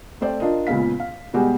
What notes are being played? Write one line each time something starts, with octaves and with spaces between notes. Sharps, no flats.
A3 C4 C5 D5 G5
D4 F4 A#4 D#5
C#2 A#2 C#3 B3 F5 B6
F5
B2 G3 G#3 B3 F#4 G4